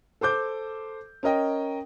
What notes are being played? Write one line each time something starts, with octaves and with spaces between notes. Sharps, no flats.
A4 C5 D6 G6
C#4 A#4 D#5 G5